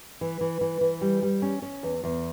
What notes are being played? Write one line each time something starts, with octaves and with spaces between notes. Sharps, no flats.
E3
E3
E3
E3
G3
G3
C#4
C#4
E2
E2